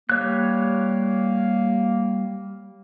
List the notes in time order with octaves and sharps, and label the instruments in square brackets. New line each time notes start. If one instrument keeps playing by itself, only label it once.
[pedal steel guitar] G3 C#5 F#6 [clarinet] A#3